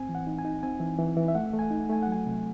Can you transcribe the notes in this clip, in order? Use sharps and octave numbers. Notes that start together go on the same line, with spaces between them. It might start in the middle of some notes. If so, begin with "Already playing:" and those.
Already playing: A2 C4 G#5
E3
F#5
D#4
G#5
D#4
C4 G#5
E3
E3
E3
E5
A3 F#5
A3
G#5
D#4
A3 G#5
F#3 F#5
G#5
C3